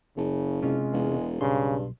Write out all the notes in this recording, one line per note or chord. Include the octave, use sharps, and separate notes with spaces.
F#1 C#3
C3 G#3 C#4 F4
E1
B1 G2 C#3 C6